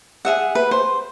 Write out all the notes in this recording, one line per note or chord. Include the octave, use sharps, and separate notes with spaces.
G#4 E5 F#5
B4
C5